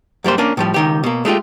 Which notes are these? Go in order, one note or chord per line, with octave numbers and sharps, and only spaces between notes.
F#2 G3 A#3 C5
A#3 C#4 D4
A2 F3 G3
C#2 D#3 G4
B2 A#3
G#3 A3 F4 G4